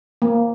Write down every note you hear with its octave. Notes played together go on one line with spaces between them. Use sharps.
A#3